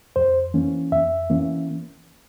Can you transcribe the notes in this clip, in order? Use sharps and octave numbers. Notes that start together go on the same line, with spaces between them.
F2 C5
E3 A#3 C#4
F2 E5
E3 A#3 C#4